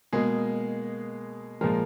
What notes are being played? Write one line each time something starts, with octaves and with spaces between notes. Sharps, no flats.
B2 G#3 A#3 G#4
A#2 F3 G#3 A#3 A#4